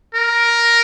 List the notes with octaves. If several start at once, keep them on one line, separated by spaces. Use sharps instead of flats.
A#4